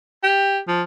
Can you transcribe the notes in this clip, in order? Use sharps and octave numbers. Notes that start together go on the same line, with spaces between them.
G4
F3